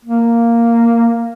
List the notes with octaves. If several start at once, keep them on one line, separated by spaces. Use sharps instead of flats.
A#3